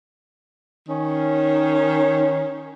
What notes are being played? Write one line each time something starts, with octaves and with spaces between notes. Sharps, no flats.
D#3 C#4